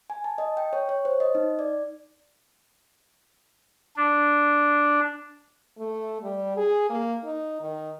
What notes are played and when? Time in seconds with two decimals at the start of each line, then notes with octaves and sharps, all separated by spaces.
0.10 G#5
0.24 A5
0.38 D#5
0.57 G5
0.73 C#5
0.89 C#5
1.05 C5
1.20 D#5
1.35 D#4
1.59 D5
3.96 D4
5.78 A3
6.22 G3
6.56 G#4
6.89 A#3
7.24 D#4
7.61 D#3